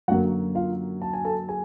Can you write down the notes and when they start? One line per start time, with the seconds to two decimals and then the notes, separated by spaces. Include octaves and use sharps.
0.08 F#2 D3 F#3 A#3 F#4 F#5
0.55 F4 F5
1.02 A5
1.13 G#5
1.24 A4 A5
1.49 G#4 G#5